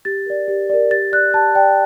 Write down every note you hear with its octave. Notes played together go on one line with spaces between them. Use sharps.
G4 A6
A#4 D5
G4
A#4 D5
G4 A6
D5 F#6
G4 A5
D5 G5